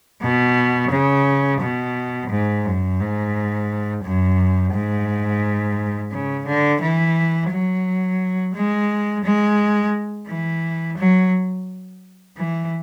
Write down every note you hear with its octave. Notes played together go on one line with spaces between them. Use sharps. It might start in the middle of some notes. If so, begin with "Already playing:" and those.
B2
C#3
B2
G#2
F#2
G#2
F#2
G#2
C#3
D3
E3
F#3
G#3
G#3
E3
F#3
E3